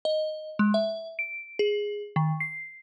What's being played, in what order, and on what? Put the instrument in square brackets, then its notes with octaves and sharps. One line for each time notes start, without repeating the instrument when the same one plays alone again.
[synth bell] D#5
G#3
E5
D7
G#4
D#3
C7